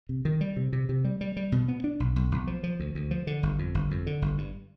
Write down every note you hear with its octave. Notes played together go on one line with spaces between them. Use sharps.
C3
D#3
G3
C3
C3
C3
G3
G3
G3
B2
B3
D4
B1
B1
B1
F3
F3
D2
D2
F3
D3
G1
F2
G1
F2
D3
G1
G2